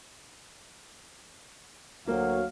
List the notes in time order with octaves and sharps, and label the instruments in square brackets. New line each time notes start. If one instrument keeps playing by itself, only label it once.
[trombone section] D2 F#3 [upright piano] A#3 [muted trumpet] F5